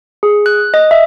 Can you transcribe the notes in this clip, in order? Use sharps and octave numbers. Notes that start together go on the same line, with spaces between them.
G#4
F#6
D#5
E5